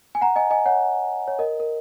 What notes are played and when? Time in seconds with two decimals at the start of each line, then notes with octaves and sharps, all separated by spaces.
0.15 G#5
0.21 F#5 A#5
0.36 D#5 G#5
0.50 D#5 G#5
0.66 C#5 F#5
1.28 C#5
1.39 A#4 D#5
1.60 A#4